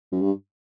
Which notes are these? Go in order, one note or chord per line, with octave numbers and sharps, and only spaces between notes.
F#2
G2